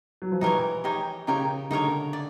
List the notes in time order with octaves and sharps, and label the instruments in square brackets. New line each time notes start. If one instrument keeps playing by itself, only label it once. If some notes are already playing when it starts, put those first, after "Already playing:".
[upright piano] F#3
F3
[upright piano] E3 [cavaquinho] D#4 G4 A#4 C#5
[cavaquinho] D#4 G4 A#4 C#5
[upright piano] C#3 [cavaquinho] D#4 G4 A#4 C#5
[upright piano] D3 [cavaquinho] D#4 G4 A#4 C#5
[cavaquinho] D5